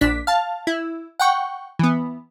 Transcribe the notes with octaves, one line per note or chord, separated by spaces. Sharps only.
A#1 D4 B6
F5 A5
E4
F#5 G5 C#6
E3 B3